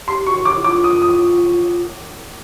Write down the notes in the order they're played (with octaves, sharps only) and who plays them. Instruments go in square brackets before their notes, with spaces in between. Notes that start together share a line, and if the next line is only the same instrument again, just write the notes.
[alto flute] G4 [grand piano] C6
[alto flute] F#4 [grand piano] C#6
[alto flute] G4 [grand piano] D6
[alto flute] E4
[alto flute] F4 [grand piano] D6
[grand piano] D#6
D#6